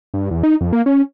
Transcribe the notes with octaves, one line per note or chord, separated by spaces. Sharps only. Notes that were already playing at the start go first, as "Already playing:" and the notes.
G2
E2
D#4
F2
A#3
C#4